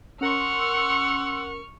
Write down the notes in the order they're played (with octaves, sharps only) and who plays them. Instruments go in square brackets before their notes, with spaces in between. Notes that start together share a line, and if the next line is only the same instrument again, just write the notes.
[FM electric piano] C#4 A#4 [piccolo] F#5 [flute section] C6 E6 [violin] C#6 F6